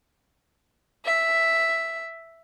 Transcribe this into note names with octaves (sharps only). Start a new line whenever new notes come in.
E5